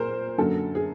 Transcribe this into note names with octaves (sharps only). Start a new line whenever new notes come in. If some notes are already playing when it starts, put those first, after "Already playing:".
Already playing: A#2 A#4 C5
F#2 D3 F#3 A#3 A4
G#4